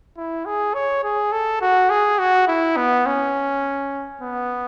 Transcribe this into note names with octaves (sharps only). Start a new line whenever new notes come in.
E4
G#4
C#5
G#4
A4
F#4
G#4
F#4
E4
B3
C#4
B3